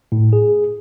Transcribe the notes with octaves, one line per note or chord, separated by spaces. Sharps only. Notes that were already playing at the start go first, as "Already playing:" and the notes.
A2
G#4